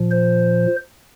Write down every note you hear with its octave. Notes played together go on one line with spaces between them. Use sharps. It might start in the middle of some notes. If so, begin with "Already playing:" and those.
Already playing: A#2 F3
C5